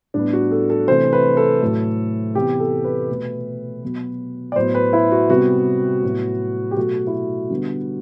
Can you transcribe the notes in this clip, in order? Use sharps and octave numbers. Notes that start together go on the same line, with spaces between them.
A2 G3 B3 D4
F#4
A4
A4
C3 E3 A3 C5
B4
A4
A2 F#3 A3
C3 E3 B3 G4
A4
B4
B2 A3
B2 F#3 B3
D5
A2 F#3 B3 C5
B4
E4
F#4
C3 G3 B3 F#4
A2 F#3 B3
G4
B2 F#3 A3 F#4
E4
F#4
D3 G3 B3